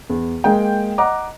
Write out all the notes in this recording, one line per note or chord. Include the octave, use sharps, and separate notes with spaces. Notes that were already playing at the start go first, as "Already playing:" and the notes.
E2
G#3 A#3 G#4 G5
D#5 F#5 A#5 D6